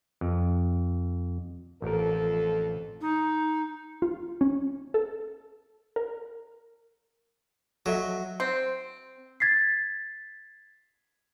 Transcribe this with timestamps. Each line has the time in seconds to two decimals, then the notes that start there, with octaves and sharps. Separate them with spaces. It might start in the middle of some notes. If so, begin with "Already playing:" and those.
0.21 F2
1.82 A1 F2 F3 A4 A#4
3.01 D#4
4.02 F4
4.41 C#4
4.94 A4
5.96 A#4
7.86 F#3 A4 D#5 E5
8.40 C4
9.40 G#6 A6 B6 C7